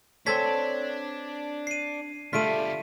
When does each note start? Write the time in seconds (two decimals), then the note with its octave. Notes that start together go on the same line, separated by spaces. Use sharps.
0.27 C4 D4 A4 C#5 A5 G#6 B6
1.67 C7 D#7
2.33 D3 G3 A3 F4 B6 D7 D#7